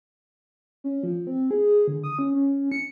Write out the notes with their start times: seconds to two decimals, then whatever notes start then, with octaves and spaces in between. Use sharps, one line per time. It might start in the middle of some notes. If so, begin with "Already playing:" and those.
0.84 C#4
1.03 F3
1.27 C4
1.51 G#4
1.88 D3
2.04 D#6
2.19 C#4
2.34 C#4
2.72 C#7